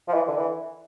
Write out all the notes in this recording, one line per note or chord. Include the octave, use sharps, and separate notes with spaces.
F3
E3
D3
E3